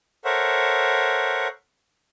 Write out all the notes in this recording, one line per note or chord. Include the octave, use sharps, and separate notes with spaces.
A4 A#4 C5 C#5 E5 F#5